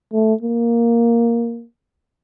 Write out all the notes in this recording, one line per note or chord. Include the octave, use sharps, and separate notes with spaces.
A3
A#3